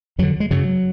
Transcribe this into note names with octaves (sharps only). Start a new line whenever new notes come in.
F2 D3 F#3
G#3
F#2 C#3 F#3